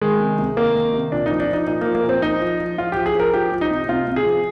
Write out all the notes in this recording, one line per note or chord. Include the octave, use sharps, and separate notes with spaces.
D#3 G#3
C3
C3
D#3 A#3
D#3
C3
A#2 D4
F3 D#4
D4
F3 D#4
A#2 D#4
A#3
F3
A#3
A#2
C4
F3 D#4
F3
F3
F3 F4
F3 G4
G#4
F3 A#4
F3 G4
F3
D#4
C3
C3 F4
C3
G#4
F3